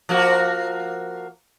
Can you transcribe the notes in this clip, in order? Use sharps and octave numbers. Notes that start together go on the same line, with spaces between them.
F3 A#3 F#4